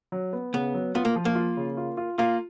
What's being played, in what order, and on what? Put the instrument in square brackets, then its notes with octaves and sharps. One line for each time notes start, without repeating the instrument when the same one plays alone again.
[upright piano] F#3
B3
[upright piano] C#3 [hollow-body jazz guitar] B3
[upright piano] F#3
[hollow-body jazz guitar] B3 [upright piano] F4
[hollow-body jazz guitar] A#3
[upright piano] F3
[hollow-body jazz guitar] A#3
[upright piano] F4
C#3
F4
F4
[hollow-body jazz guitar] A#3 [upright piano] F4